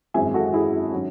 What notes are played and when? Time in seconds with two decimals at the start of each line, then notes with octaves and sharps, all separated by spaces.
0.14 G#1 F#2 E3 G#3 E5 G#5
0.34 F#4 A4
0.54 E4 G#4
0.92 D#3 F#3 C#4